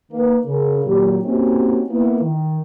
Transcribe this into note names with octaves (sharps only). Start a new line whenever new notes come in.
D#3 A#3 B4
C#3 A#4
A#2 D#3 F#3 G4
A#3 C4 C#4 D#4 F#4 G4
A#3 B3 E4
D#3